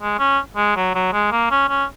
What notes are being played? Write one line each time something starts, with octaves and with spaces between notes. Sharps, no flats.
G#3
C#4
G#3
F#3
F#3
G#3
A#3
C#4
C#4